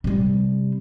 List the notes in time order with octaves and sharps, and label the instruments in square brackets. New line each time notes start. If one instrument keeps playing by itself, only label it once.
[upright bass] C3 G3